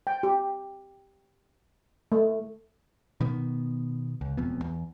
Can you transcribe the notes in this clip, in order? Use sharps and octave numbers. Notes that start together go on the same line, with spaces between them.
G5
G4
A3
B2 D#3 B3
C#2
E1 F2 B3
E2